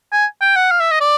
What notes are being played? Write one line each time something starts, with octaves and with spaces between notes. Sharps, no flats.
G#5
G5
F#5
F5
E5
D#5
D5